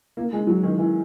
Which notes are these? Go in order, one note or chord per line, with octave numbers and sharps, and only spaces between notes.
A#3
G#3
F#3
D#3
E3